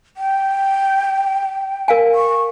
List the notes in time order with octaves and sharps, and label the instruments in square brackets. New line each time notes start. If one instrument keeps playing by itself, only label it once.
[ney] G5
[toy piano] A#4 F5 G#5
[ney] C#6